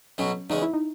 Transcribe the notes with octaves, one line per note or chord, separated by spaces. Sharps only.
B1 B2 F#3 C#4
E2 C#3 G#3 D#4
E4
D#4